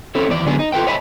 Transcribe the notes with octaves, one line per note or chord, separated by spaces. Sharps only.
C4 C#4 E4 A4 C#5
D#2 E3 D5
D3 F#3 G#3 B3 C#4 G#4
D#4
F4 A4 B4 G5
C#5 D#5 E5 G#5 A5 B5